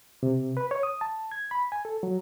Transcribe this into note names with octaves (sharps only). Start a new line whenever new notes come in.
C3
B4
C#5
D#6
A5
G#6
B5
G#5
A4
F#3